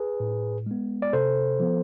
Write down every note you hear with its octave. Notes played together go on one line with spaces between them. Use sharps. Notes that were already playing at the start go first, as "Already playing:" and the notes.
Already playing: G#4 B4
A2
G#3 B3
D5
C3 A4 C5
F3 B3